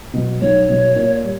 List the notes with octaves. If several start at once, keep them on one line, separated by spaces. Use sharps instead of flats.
B2 F#3
B1 C#5
B2 F#3
A#2
G3